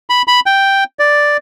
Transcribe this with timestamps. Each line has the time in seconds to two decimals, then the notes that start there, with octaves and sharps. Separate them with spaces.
0.10 B5
0.28 B5
0.46 G5
0.99 D5